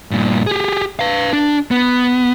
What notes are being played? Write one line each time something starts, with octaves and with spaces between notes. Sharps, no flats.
G2 A#2
G4 G#4
B4 F5
D4
B3